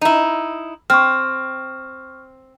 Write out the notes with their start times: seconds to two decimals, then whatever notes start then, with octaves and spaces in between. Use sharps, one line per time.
0.01 D#4 E4
0.90 C4 C#6 F6